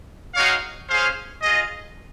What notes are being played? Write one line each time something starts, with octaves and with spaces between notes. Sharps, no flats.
G#3 D#4 F#4 C#5 F5
C#4 G#4 C5 F5
F4 G#4 D#5